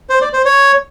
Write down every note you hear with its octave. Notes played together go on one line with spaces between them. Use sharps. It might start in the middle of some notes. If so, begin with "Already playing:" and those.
C5
D5
C5
C#5